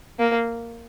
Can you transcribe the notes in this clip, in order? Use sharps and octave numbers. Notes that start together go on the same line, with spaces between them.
A#3